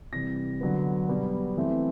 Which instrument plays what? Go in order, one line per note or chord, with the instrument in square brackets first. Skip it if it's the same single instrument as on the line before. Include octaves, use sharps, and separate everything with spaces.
[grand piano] C3 E3 G3 A#6
D3 F#3 B3
B2 G3 B3
E3 A3 C4